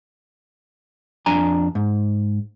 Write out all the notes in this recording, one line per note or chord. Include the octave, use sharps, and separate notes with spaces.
F2 D4 G#5 A#5
G#2